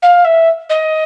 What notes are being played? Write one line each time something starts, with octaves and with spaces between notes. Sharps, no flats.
F5
E5
D#5